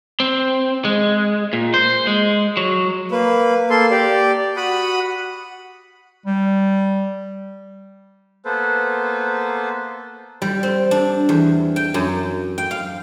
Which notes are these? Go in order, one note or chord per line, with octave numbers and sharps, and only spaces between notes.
C4
G#3
A#2
C5
G#3
F#3
A#3 B4
A#3 A4 C6
G4 D5
F#4 F#5 B5 D#6
G3
A#3 B3 A4 B4 C5
G3
C4
D4
E2
G5
F#2
G5
F5